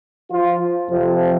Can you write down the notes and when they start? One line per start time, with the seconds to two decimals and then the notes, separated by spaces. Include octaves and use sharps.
0.30 F3 F4
0.89 F2 C3 F3